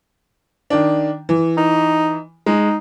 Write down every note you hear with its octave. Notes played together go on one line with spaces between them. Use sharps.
D#3 D4
E3
D#4
G#3 D#4